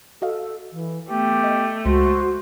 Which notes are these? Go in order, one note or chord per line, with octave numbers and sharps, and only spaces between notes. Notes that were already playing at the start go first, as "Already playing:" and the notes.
F#4 A4 D#5 F5
E3
A3 B3 G4
D#5
C#2 G#3 F#4 C5 A#6